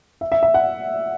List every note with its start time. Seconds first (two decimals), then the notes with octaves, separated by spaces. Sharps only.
0.21 E5
0.32 E5
0.43 E5
0.54 F#5